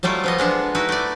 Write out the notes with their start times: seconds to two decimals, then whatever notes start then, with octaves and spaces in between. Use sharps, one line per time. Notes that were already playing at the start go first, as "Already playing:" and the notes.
0.03 F#3 G3 A3 E4 F4
0.24 F3 B3 D#5
0.38 G#3 B3 D4
0.75 D#4 E4 F#4 B4
0.89 A3 D5